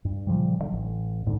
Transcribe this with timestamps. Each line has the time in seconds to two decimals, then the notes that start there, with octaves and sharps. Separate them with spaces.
0.05 G2
0.27 A#2 C#3 F3 G3
0.59 D2 D3 F#3
0.72 A1
1.25 A1 G#2 D3